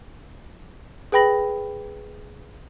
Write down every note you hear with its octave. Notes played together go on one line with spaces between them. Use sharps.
G#4 B4 G5 B5 A#6 F#7